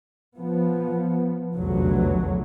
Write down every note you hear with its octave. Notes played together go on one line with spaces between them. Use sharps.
F3 B3
F1 B1 E2 D3 F#3